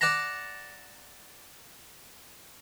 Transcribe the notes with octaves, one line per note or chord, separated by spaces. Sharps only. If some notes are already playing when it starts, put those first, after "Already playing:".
D5 F#5 A5 A#5